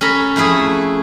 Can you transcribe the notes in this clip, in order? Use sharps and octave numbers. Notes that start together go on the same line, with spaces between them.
C#4 A4 A#5 B5
F2 A3 E4 G#4 E5